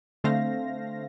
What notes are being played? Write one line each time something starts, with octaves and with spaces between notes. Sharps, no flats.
D3 A3 C4 C5 F5 A#6